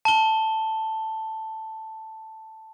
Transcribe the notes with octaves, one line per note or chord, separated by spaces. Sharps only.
A5 G7